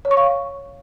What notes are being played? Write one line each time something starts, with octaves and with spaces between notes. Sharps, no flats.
C#5
C#6
F5